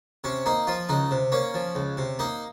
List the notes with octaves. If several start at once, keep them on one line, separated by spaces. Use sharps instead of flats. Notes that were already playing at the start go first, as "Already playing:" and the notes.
C3 C#4
A#3 D#4
F3 F4
C#2 D#4
C3
A#3 C#4
F3
C#2
C3
A#3 D#4